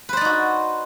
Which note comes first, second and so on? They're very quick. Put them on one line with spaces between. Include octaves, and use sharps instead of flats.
B4 C5 D5 D#4 F#4